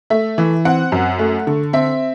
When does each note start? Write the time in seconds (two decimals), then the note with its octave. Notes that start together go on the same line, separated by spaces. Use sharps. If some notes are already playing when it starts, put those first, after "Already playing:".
0.10 A3 E5
0.38 E3
0.65 C4 F#5
0.92 F#2
1.19 A3
1.47 D3
1.73 C4 E5